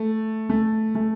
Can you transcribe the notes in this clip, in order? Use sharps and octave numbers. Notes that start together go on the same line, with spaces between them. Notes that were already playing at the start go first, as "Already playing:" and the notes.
Already playing: A3
A3
A3